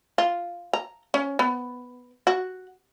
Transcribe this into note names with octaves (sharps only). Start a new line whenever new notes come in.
F4
A#5
C#4
B3
F#4